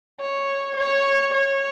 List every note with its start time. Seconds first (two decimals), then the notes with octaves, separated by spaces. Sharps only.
0.20 C#5
0.77 C#5
1.34 C#5